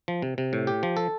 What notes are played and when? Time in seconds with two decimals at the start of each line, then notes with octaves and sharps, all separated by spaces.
0.08 F3
0.22 C3
0.38 C3
0.53 A2
0.67 G4
0.83 F3
0.97 A4